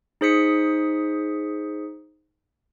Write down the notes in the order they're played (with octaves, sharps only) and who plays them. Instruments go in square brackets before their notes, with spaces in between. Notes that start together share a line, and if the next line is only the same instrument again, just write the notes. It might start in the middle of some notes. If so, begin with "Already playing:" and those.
[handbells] D#4 G#4 C5 D#6 B6 C#7